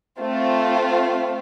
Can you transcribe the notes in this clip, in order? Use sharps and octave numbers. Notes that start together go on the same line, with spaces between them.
A3 C4 F4